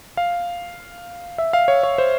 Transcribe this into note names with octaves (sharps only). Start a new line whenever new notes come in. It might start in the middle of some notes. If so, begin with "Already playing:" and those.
F5
E5
F5
C#5
C#5
C5